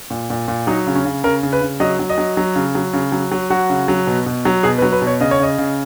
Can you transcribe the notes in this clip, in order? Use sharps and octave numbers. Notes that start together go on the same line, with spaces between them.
A#2
A#2
A#2
F#3 D#4
C#3
C#4
C#3
C#3 A#4
C#3
B4
C#3
F#3 D#5
F#3
D#5
F#3
F#3
C#3
F#3
C#3
F#3
F#3
F#3 F#4
C#3
F#3
B2
B2
F#3
B2 G#4
B4
F#3
B4
B2
C#5
C#3 D#5
C#5
C#3 D#5
C#3